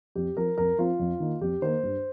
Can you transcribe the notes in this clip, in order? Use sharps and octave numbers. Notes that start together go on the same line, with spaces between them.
F2 G4
F3 C4 A#4
F2 A#4
F3 C4 F4
F2
D#3 A#3
F2 G4
D#3 A#3 C5
G2